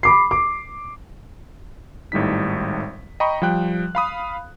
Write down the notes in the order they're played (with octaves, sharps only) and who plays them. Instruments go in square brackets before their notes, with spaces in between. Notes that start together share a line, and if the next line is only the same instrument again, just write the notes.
[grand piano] B5 D6 C7
D6
[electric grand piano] G#1 A2 G3 D#4 B6
D#5 G5 A#5 B5 C#6
F3 G3 G5 F#6
F5 B5 D#6